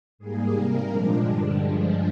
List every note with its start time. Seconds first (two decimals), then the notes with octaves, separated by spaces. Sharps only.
0.18 G#2 G3 A#3 G#4
0.53 C3 G3 A#3 A#4
0.88 A#2 F3 G#3 D4
1.22 G2 D3 G3
1.57 G2 F3 G#3 D4